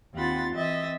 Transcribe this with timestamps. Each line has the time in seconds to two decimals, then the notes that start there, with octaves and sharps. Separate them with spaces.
0.13 D#2 C4 F4 F#5 B5 A6
0.54 E3 C4 D#5 E5 A6